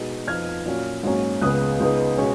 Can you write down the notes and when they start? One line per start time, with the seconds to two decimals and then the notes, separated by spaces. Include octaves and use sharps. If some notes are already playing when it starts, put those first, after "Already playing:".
Already playing: B2 G#3 D#4
0.27 F2 F3 B3 D#4 F6 G#6
0.66 A#2 F#3 C#4
1.03 G#2 F#3 A#3 C#4
1.41 C#2 C#3 G#3 B3 D#6 F#6
1.80 C#2 C#3 G#3 B3 D#4
2.18 B2 G#3 C#4